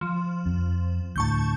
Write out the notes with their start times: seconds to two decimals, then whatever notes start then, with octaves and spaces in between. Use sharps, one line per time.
0.01 F3
0.46 F2
1.16 D2 A2 A5 C#6 G6